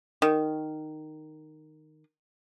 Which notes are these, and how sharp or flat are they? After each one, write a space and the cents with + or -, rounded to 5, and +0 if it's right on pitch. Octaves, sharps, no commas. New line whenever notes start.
D#3 -10